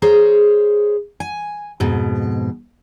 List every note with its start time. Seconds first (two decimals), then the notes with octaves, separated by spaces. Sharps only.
0.02 G#4 C5 C#5 A#5
1.20 G#5
1.80 F2 G#2 B2